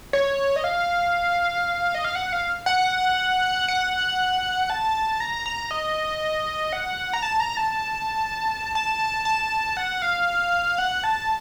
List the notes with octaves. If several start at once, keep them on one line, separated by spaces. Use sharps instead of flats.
C#5
D#5
F5
D#5
F5
F#5
F5
F#5
F#5
A5
A#5
A#5
D#5
F#5
A#5
A5
A#5
A5
A5
A5
F#5
F5
F#5
A5